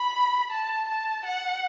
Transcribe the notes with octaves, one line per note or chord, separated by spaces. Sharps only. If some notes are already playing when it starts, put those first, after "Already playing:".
Already playing: B5
A5
A5
F#5